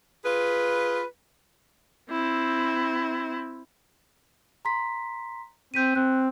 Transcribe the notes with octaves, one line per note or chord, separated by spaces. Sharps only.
F4 G#4 B4
C4 E4
A#5 C6 B6
C4 G6 B6 D#7
C4 F#6